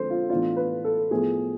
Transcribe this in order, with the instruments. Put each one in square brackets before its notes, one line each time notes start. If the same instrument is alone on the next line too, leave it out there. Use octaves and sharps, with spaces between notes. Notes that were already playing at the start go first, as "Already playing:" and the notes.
Already playing: [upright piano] F2 D3 G#3 C4 A4 C5
F4
A2 E3 B3 D4 F4
B4
A4
A2 F3 B3 G#4